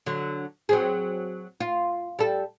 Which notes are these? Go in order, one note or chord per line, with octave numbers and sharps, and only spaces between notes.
D3 F#3
F#3 C4 G#4
F4
G3 A4